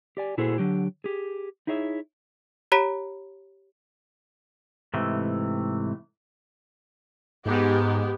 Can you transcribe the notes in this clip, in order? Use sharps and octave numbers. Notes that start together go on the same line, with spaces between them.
G4 D5 G#5
A#2 E4 F#4 G#4 A4 C5
D3 F#3 G4
G4 G#4
D#4 E4 G#4 C#5 E5
G4 C#5 A#5 B5 B6
G#2 C3 E3 A3
G#2 G#3 B3 G4